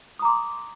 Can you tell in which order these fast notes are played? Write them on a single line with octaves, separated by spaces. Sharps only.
D#6 A#5 D6 C6